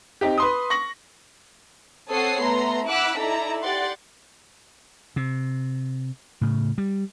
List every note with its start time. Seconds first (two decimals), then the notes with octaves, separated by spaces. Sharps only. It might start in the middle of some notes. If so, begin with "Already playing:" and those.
0.21 C4 D#4 G4
0.38 B4 C6 D#6
0.70 C#6 A#6 F#7
2.10 C4 A4 C#5 F#5 D#6 C7
2.42 A3 B3 A#5 C6
2.86 E4 F#5 D6 E6 F#6 B6
3.17 D#4 E4 A4 D5 A#5
3.62 G4 D5 F#5 C6 A6
5.16 C3
6.41 A2 C#3
6.78 G3